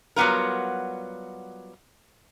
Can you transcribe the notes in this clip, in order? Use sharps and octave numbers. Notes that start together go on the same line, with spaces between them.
F#3 G3 B3 F4 A#4